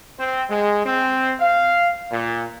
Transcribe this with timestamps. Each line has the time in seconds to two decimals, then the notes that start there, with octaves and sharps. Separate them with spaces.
0.19 C4
0.50 G#3
0.86 C4
1.40 F5
2.12 A#2